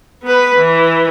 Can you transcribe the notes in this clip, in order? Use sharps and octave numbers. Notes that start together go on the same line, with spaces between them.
B3 B4
E3